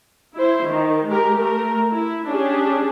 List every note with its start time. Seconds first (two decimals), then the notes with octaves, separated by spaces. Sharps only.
0.36 E4 C5
0.66 D#3
1.08 G#3 G4 A#4
1.37 A3 A#4
1.94 E4
2.29 C#4 D4 G4 G#4